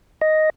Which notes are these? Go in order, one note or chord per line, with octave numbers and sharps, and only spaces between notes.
D#5